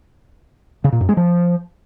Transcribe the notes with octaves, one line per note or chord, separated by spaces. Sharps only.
C#3
A#2
F#2
G#3
F3